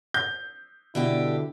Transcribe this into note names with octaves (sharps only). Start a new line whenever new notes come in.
G6
B2 D3 D4 E4 G4